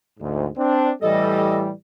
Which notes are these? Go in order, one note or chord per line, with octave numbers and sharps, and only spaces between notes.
D2 G#2
C4 D4
A2 E3 G3 A4 D#5